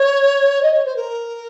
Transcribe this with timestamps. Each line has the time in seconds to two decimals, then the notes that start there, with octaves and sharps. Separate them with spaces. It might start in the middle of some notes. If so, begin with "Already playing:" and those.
Already playing: C#5
0.63 D#5
0.74 C#5
0.85 C5
0.96 A#4